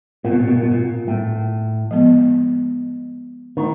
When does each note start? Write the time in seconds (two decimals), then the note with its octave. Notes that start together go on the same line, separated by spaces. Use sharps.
0.24 A#2 C4 F4 A#4
0.32 B2
0.39 A#2
0.48 B2
0.55 A#2
0.63 B2
0.71 A#2
1.08 A2
1.91 F3 G#3 B3
3.57 D#3 A3 C#4 E4